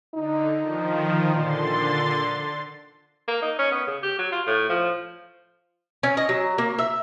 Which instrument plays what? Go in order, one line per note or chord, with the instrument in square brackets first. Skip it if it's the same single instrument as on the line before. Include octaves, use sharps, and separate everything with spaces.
[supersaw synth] D3 [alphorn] D#4
[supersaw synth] D#3 F3
[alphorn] A#2 [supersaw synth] D3 C6 A6
[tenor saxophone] A#3
D#4
C#4
B3
C#3
G4
F#3
F4
A2
F3
[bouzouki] C#4
D#5
F#3
A#3
E5